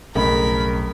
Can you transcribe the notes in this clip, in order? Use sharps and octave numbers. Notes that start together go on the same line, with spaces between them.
B1 F2 A2 C#3 A#4 B5